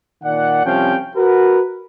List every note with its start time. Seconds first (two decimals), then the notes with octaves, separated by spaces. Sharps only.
0.24 A#2 D#3 D5 F#5
0.65 C2 C3 F3 C#4 F5 G5
1.16 F#4 A#4 B4